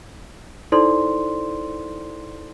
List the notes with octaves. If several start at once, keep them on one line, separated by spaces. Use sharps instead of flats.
D#4 E4 A4 C5 D5 C6